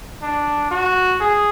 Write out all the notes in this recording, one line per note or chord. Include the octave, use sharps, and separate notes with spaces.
D4
F#4
G#4